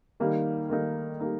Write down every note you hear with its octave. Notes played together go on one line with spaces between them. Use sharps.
D#3 G3 A#3 D#4
D#3 G3 A#3 D#4
G3 A#3 D#4